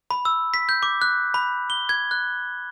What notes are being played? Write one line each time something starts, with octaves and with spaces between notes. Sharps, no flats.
B5
E6
B6
G6
D6
F#6
B5
G7
G#6
F#6